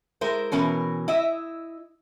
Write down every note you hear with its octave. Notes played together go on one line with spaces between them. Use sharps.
G#3 E4 A#4 C5
B2 E3 C#4 A#4
E4 D#5 E5